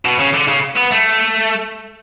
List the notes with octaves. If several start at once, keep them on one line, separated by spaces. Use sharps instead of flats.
B2
C#3
D3
C#3
B3
A3